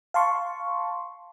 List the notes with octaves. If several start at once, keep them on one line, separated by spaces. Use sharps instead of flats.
F5 A5 C6 C#6